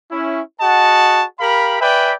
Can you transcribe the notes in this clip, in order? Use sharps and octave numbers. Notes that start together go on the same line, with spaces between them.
C#4 E4
F#4 G#4 D#5 F#5 A5
G4 A#4 F5 B5
B4 D5 E5 G5 G#5 B5